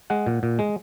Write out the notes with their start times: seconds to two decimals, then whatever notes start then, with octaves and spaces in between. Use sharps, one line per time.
0.10 G#3 F#5
0.27 A#2
0.43 A#2
0.59 G#3